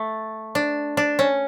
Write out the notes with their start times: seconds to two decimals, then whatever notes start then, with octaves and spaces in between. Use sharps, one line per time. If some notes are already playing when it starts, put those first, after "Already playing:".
Already playing: A3
0.55 D4
0.97 D4
1.19 C#4